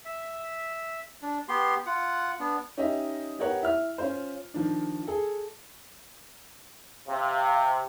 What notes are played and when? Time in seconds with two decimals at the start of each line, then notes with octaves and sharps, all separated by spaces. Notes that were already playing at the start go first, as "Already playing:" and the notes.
0.05 E5
1.22 D4
1.48 B3 G4 C6
1.86 F4 F#5
2.40 B3 D4
2.78 C#4 D#4 G4 D#5 E5
3.39 B3 G4 A#4 C#5 F#5
3.62 E4 E5 F6
3.98 C#4 F4 C5
4.54 D#3 F3 D4
5.07 G#4 A4
7.08 C3 F5